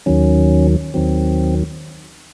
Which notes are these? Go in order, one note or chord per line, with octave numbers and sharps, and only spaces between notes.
D#2 D#3 F#3 C#4
D#2 D#3 F#3 C4